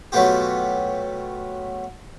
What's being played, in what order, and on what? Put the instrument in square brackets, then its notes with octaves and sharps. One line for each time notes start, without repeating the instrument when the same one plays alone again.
[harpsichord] B2 F#3 A3 B3 F4 G4